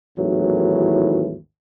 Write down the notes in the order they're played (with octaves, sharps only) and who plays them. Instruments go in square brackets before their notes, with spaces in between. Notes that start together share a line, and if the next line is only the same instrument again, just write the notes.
[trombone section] G#1 D#2 A2 E3 F#3